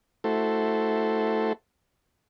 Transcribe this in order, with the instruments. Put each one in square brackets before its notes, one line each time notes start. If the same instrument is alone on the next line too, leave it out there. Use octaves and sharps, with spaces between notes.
[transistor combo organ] A3 E4 F#4 A4 C5